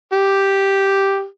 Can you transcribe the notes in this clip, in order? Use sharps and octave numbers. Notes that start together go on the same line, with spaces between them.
G4